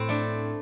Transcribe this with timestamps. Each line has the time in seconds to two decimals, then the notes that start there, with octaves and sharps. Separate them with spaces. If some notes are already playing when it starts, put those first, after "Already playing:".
Already playing: A2 C4
0.09 A3 D4